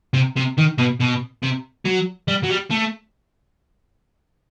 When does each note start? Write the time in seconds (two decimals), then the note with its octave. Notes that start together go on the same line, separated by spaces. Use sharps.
0.13 C3
0.36 C3
0.58 D#3
0.78 B2
1.00 B2
1.43 C3
1.85 F#3
2.28 G3
2.44 F#3
2.50 G3
2.71 A3